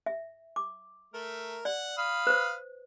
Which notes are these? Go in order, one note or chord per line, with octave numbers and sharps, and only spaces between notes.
E5
D6
A3 A#4
D5 F#5
F5 B5 D#6
B4 C5